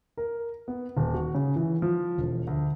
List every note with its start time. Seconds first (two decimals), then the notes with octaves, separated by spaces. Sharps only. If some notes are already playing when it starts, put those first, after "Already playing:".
0.17 A#4
0.68 B3
0.97 D#1
1.14 F#4
1.35 C#3
1.56 E3
1.82 F3
2.18 E1
2.47 D2